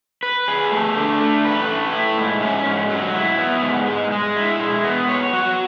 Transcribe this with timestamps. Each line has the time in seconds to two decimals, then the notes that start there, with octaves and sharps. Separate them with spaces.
0.23 B4
0.48 G#4
0.71 A3
0.97 D4
1.21 A3
1.45 B4
1.68 A3
1.93 E4
2.17 G#2
2.42 C#4
2.66 G#2
2.89 F#3
3.15 E4
3.39 B3
3.62 G#2
3.87 G#3
4.11 G#3
4.36 E4
4.59 G#3
4.84 B3
5.09 C#5
5.33 F#4